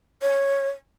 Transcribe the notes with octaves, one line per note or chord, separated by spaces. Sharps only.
C#5